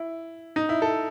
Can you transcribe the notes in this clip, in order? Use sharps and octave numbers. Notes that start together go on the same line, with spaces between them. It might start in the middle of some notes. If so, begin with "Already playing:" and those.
Already playing: E4
D#4
E4
A4